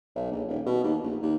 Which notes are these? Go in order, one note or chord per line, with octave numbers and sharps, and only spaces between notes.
B1
A#1
D#1
B2
D#2
A#1
D#2